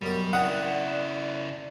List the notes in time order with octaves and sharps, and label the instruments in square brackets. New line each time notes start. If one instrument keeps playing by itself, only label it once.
[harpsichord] F#2 B2 A#4 [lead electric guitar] G3
[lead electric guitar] C#3 E4 [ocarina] D5 [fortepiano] F#5 [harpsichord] G5 D#6